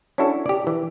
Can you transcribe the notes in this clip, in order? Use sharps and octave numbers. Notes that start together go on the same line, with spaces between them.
C#4 D4 E4 F#4 A4
G4 D5
E3